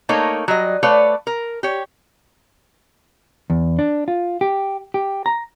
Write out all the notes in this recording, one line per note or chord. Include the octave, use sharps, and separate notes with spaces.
A3 A#3 D#4 C#5
F#3 G3 D#5
A3 B4 C#5 D5 F5
A#4
G4 C#5
E2
D4
F4
G4
G4
A#5